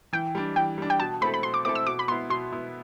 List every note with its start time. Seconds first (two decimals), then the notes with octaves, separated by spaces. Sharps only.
0.13 E3 G5
0.35 G3 D4
0.56 E3 G5
0.78 G3 D4
0.90 G5
1.00 B2 A5
1.21 A3 C4 E4 A4 B5
1.34 B5
1.43 B2 C6
1.54 D6
1.65 A3 C4 E4 A4 D6
1.75 E6
1.87 B2 D6
1.99 B5
2.08 B3 E4 C6
2.30 B2 C6
2.52 B3 E4